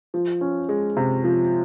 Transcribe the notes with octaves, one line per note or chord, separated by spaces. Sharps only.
F3
C#4
G#3
C3
F3